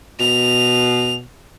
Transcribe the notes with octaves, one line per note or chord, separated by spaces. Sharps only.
B2 F7